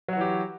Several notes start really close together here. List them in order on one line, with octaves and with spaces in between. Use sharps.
F#3 F#4 E3 G4